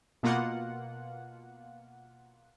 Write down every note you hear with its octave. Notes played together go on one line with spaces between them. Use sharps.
B2 A#3 F4 F#5